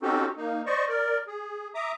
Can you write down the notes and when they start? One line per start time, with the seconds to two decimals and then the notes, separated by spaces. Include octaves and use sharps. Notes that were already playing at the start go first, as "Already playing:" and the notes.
0.02 C4 C#4 D#4 F#4 G4 A4
0.37 A#3 D#4
0.66 C5 D5 D#5 C#6
0.88 A#4 D5
1.27 G#4
1.75 E5 A#5 D6 D#6